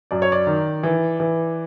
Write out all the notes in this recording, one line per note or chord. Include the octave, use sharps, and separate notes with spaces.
F#2 D5
C#5
D5
D#3
E3
E3